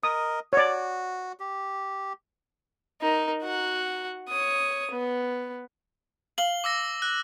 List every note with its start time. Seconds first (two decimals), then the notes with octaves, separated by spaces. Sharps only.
0.03 A#4 D#5 D#6
0.53 F#4 C#5 D5
1.40 G4
3.02 D#4 A#4
3.43 F#4 F#5
4.29 C#5 D#6
4.91 B3
6.38 F5 F#7 G7
6.64 D6 E6 A#6
7.02 F#6